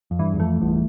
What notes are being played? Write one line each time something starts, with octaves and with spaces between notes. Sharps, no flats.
F2
G2 E3
E2
F2 A3
G1 E2